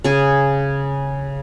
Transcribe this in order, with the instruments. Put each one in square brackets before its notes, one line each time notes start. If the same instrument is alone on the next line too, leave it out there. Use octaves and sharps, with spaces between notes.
[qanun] C#3 G#4